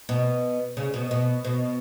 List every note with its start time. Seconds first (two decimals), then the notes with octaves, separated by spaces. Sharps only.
0.09 B2
0.77 C#3
0.94 B2
1.11 B2
1.45 B2